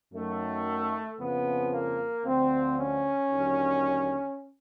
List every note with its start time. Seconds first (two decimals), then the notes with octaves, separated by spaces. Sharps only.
0.13 F#2 D#3 F#3 A3
1.19 F2 C#3 F3 B3
1.72 A#3
2.25 D2 D3 F3 C4
2.78 C#4
3.30 D#2 D3 F#3